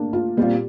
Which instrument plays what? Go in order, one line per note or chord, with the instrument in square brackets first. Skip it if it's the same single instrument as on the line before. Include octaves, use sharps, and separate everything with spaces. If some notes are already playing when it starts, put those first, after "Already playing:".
Already playing: [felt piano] A3 A#3 D4
F4
[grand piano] A#2 G3 C4 F4 [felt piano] G4